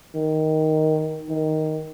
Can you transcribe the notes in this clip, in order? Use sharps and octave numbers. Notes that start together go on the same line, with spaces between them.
D#3
D#3